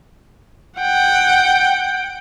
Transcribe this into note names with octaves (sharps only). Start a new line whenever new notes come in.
F#5 G5